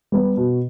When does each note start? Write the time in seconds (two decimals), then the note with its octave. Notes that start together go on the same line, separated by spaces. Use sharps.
0.12 G3 B3
0.37 B2